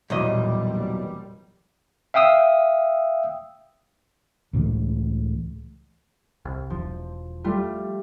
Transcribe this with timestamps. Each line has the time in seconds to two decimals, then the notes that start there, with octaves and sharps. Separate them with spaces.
0.10 F#1 B1 E2 A#2 G3 D#5
2.14 E5 F5 G5 D#6 E6
4.53 C#2 A2 E3 G#3
6.45 C2
6.70 E1 F3
7.44 G3 A3 F4